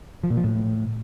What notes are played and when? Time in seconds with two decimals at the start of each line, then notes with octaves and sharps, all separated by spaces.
0.24 F3
0.30 A#2
0.37 F3
0.44 A2